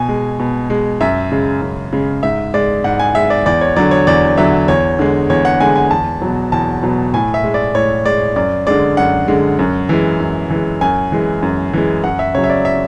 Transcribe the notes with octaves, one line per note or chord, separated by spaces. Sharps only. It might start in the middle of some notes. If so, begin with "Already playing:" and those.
Already playing: B2 G#5
G#3
B2
G#3
F#2 E5
C#3 G#3
F#2
C#3 G#3
G#2 E5
G#3 D5
G#2 F#5
G#5
G#3 E5
D5
E2 D5
C#5
D3 F#3 D5
C#5
E2 D5
D3 F#3 E5
E2 C#5
D3 G#3
E2 C#5
F#5
D3 G#3 G#5
G#5
E2 A5
B2 F#3
E2 A5
B2 F#3
A2 G#5
E5
G#3
D5
A2 C#5
G#3 D5
F#2 D5
D3 G#3 D5
F#2 F#5
D3 G#3
F#2
E3 G#3
F#2
E3 G#3
F#2 G#5
E3 G#3
F#2
E3 G#3
F#2 F#5
E5
C#3 F#3 C#5
E5
D5
E5